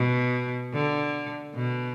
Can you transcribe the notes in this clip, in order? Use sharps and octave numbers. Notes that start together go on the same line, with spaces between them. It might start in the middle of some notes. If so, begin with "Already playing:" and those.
Already playing: B2
D3
B2